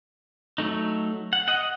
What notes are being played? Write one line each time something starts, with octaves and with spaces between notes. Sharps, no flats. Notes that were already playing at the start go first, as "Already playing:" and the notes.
F#3 A3 D#4
F#5
D#5 F#5